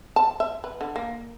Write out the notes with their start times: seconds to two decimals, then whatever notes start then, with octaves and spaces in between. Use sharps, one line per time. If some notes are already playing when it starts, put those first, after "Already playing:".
0.16 A5
0.40 E5
0.64 B4
0.81 D3
0.96 A#3